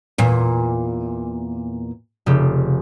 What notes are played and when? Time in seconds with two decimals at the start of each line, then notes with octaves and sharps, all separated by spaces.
0.18 E2 A#2
2.26 F1 C#3 G4